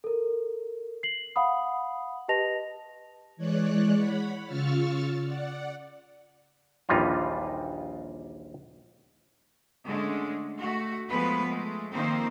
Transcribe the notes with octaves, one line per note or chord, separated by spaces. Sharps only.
A4 A#4
C7 F#7
F5 F#5 B5 D#6
G4 B4 D#5 A5 A#6 F7
E3 G#3 C#5 D5 F#6
C#5 F#5 B5
C#3 F4 C#6 E6 F6 A6
D5 F#5
A#1 D#2 E3 G3 D#4 F4
D3 G#3 A3 C#4 D4
A3 F#4
F3 G#3 A3 B3 B4
G#3 A3
D#3 F3 A#3 C4 D#4 C5